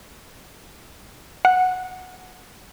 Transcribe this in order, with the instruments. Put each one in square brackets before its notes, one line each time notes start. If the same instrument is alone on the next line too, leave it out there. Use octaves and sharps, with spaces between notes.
[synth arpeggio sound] F#5